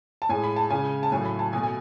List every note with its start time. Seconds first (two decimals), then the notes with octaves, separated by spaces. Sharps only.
0.22 A5
0.29 A2 G#3 G#5
0.44 B5
0.56 A5
0.70 C#3 G#3 G#5
1.03 A5
1.12 A2 F#3 A3 G#5
1.26 B5
1.39 A5
1.53 B2 A3 G#5
1.63 G#5